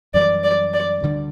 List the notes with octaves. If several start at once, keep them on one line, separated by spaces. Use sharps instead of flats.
F#2 E3 G3 D5
D5
D5
D2 D3 G3